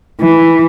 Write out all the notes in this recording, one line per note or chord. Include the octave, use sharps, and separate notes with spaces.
E3